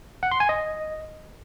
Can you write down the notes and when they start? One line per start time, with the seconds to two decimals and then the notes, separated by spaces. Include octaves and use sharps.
0.23 F#5
0.32 C6
0.40 G#5
0.49 D#5